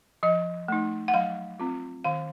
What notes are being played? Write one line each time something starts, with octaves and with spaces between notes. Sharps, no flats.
F3 D#5
A3 D#4
F#5
F#3 F5
C4 F4
D#3 F5